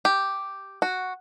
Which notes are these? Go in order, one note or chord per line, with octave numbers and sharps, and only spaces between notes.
G4
F#4